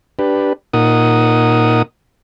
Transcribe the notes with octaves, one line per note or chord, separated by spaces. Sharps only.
D4 G4 B4
A#2 D#4 A#4 F#5 D#6